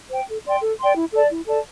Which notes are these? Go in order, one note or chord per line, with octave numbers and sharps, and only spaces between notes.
C5 G5
A4
D5 G5 C6
A4
D5 G5 C6
E4
A4 D5 A5
E4
A4 D5 A5